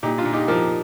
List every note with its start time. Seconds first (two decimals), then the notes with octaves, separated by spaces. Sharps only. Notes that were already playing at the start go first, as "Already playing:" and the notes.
0.03 A#2 D#4 G4
0.18 D4 F4
0.25 A#2
0.33 D#4 G4
0.48 F3 G4 A#4